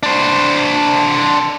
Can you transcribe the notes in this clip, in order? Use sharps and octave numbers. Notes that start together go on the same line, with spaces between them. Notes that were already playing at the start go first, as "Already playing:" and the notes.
D4 C5